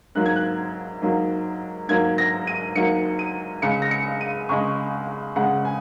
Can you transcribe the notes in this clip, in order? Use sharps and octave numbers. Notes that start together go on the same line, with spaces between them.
G#2 F#3 A#3 F#6
G#6
F#6
G#2 F#3 A#3
G#2 F#3 A#3 G#6
A#6
D#7
G#2 F#3 A#3 C#7
D#7
C#2 C#3 G#3 C#7
A#6
C#7
D#7
C#2 C#3 G#3 C#6
C#2 C#3 G#3 F#5
G#5